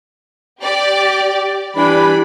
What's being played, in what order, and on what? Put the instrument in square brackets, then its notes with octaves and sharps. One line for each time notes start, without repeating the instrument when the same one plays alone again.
[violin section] G4 D5
[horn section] E3 G3 D4 [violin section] B5